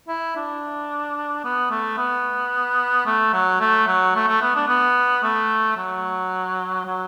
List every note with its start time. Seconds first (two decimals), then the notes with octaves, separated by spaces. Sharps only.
0.08 E4
0.36 D4
1.45 B3
1.71 A3
1.98 B3
3.06 A3
3.33 F#3
3.60 A3
3.87 F#3
4.15 A3
4.28 A3
4.42 B3
4.56 D4
4.68 B3
5.23 A3
5.77 F#3
6.86 F#3